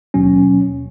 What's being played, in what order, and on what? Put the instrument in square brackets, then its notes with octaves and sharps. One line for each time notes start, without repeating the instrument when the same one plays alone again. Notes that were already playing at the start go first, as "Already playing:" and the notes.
[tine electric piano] D#2 B2 F#3 C#4